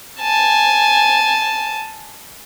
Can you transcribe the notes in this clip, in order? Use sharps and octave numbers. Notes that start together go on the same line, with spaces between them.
G#5 A5